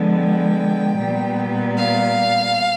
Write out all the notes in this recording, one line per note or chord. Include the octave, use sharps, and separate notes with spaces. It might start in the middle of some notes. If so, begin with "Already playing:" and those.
Already playing: D3 F3 G#3 B3
G5
A#2 G3 B3
F5